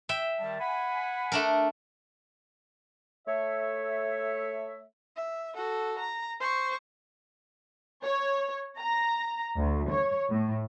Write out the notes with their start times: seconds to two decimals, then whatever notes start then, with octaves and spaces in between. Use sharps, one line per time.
0.09 E5 G5
0.40 D#3 G3 A5
0.60 F#5 G#5 B5
1.32 A3 D4 A#4
3.28 A3 C#5 E5
5.16 E5
5.55 F#4 A4
5.99 A#5
6.40 C5 C#6
8.03 C#5
8.78 A#5
9.56 D2
9.91 C#5
10.29 A2